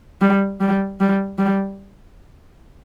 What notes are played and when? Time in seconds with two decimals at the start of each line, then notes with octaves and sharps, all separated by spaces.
0.21 G3
0.60 G3
1.00 G3
1.38 G3